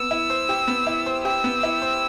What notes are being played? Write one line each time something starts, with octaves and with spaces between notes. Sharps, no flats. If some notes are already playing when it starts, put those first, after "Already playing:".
Already playing: B3 E6
E4
C5
G4
B3
E4
C5
G4 E6
B3
E4
C5